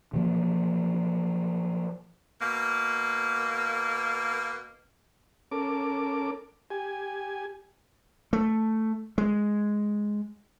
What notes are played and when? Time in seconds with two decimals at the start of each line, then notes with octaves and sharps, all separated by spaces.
0.13 B2 E3 F3 A#3
2.41 B2 A#3
5.51 C#4 A4 A#4 D6
6.70 G4 G#5
8.33 A3
9.18 G#3